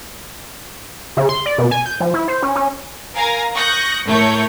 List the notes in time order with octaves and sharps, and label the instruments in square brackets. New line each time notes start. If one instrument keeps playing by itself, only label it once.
[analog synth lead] C#3
C6
D5
B2
G#5
G6
F3
E4
C5
C#4
C#4
[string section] A#4 F5 G#5 A#5
C#6 D#6 F#6 G6 A#6
A2 A3 A#4 C#5 C#6 G6